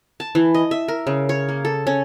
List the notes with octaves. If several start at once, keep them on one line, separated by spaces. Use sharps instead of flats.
A5
E3
D#5
E5
A#4
C#3
C#5
A#3
A4
C#4